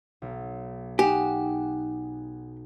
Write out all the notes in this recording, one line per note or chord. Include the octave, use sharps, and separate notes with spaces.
B1
D#4 G4 F#5 G#5